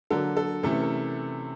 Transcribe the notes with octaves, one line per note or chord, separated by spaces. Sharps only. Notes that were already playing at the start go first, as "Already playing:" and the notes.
D3 F#3 A#3 A4
A4
C3 E3 A3 C#4 A4
A#4